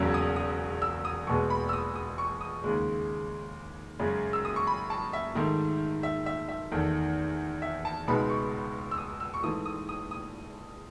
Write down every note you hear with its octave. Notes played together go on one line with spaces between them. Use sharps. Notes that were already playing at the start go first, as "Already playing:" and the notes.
Already playing: E1 E2 C#3 F#3 C#4 E6
D#6
D#6
E6
D#6
E2 B2 G#3 B3 C#6
B5
E6
D#6
D#6
C#6
D#6
D#2 C#3 G#3
F#2 C#3 G#3 C#4
E6
D#6
C#6
B5
A5
E5
G#2 D#3 A3
E5
E5
E5
E2 D#3 A3
E5
A5
C#2 B2 G#3 B3 D#4 B5
C#6
E6
D#6
E6
C#6
G#2 E3 A3 D#6
D#6
D#6
D#6